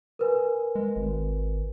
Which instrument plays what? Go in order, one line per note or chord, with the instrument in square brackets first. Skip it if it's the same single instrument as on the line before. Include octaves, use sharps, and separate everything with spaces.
[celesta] A#4 B4 G#5
[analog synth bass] G#3
G#1